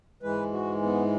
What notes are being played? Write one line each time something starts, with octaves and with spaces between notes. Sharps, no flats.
G#2 E3 G#3 B4
F#4
B3